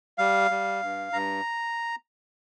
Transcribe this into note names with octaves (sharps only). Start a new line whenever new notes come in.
G3 F5
G3
G2
G2 A#5